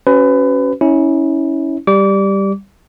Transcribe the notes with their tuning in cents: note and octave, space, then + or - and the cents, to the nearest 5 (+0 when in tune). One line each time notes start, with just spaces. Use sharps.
C#4 +0 F#4 +25 B4 +25
C#4 +0 E4 -30
G3 +0 D6 -30